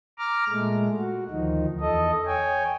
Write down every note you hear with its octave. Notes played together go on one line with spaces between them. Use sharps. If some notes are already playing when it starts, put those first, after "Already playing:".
A#5 D6 F6
A#2 G#3 A3
F#4
D2 D#3 F3 D#4
E2 A4 D#5
C#5 G5 G#5